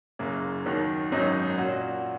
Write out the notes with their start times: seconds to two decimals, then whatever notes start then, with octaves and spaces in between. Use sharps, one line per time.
0.19 F#1 F#2 C#3 A#3
0.65 D#2 D#3 F#3
1.12 G#1 F#2 F#3 D#4
1.58 A#2 F#3 C#4 F#4